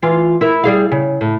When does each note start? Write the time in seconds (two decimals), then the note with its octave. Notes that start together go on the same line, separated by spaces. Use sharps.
0.03 E3 F4
0.41 E4 A#4
0.64 G3 G#4 F5
0.92 C#3
1.21 A2